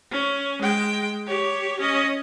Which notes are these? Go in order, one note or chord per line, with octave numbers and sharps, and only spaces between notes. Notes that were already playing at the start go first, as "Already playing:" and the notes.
C#4
G#3 G5
G4 C#5
C#4 D#5